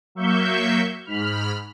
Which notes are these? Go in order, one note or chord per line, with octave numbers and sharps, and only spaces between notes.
F#3 A#3 E5 C#6 G6
G#2 B5 F6